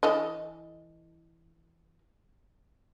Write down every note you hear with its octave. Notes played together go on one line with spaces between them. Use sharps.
E3 A4 D#5